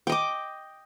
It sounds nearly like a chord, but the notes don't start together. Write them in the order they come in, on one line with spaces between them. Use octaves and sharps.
G5 D#5 D6